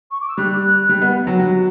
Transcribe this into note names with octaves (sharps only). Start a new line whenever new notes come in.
C#6
D6
E6
G3 F#6
G3
B3
F#3
F#3